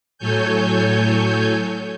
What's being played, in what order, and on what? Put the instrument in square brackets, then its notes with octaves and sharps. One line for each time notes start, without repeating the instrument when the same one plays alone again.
[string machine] A2 F#3 A4 C#5 G#5 G6